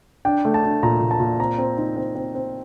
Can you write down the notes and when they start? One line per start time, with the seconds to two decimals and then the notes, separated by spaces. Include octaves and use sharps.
0.25 D4 G5
0.45 A3
0.54 A5
0.63 D4
0.83 A#2 A#5
1.01 A#2
1.11 A5
1.20 A#2
1.39 C4 A#5
1.58 C4
1.78 D#4
1.96 C4
2.15 C4
2.35 C4